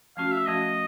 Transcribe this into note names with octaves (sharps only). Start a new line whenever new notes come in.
F3 A3 C#4 F#4 F5
E5
F3 A3 C#4 F#4 D#5